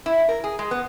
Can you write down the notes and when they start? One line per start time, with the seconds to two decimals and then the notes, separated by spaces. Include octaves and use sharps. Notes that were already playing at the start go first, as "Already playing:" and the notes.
0.06 E4
0.29 A#4
0.44 G#4
0.59 G#3
0.71 B3